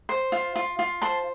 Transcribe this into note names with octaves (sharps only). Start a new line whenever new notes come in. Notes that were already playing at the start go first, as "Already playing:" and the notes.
C5
F4
F4
F4
C5 A5 C6